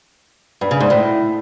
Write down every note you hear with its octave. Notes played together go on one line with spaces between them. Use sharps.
G2
C#3
G#2
A2